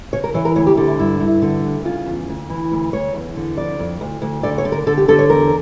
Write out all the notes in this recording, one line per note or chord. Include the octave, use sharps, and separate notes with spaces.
C#3 C#5
A#4
E3 C#5
A#4
D2 C#5
G4
D3
E4
G2 E4
G2
D3
D2
C#3 F4
E2
D2
E3
D2
D2 C#5
E2
D3
F2 D5
F2
D2
D2
D3 D5
C#5
D3
A#4
D3 A4
G4
D3 A4
C#5
E2 A#4